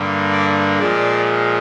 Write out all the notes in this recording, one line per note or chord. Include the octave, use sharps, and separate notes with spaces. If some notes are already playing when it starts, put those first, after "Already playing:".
Already playing: G2 D3 G3 A#3
D5
A#2 F3 G#3 D5